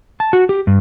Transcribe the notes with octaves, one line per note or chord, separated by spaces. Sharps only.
A5
F#4
G4
G2